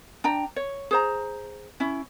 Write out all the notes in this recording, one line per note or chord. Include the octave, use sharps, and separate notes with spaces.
D4 G5 A#5
C#5
G#4 C5 A#5
C#4 E4